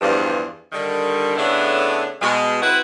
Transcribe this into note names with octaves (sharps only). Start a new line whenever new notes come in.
E2 G2 F3
D3 D#3 G3
A2 C#3 B3 D4 E4 A4
B2 G#3
C4 E4 F#4 B4